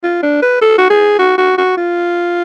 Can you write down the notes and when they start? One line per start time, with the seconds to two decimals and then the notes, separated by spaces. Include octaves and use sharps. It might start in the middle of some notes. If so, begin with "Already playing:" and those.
0.03 F4
0.23 D4
0.42 B4
0.61 A4
0.78 F#4
0.90 G#4
1.19 F#4
1.38 F#4
1.58 F#4
1.77 F4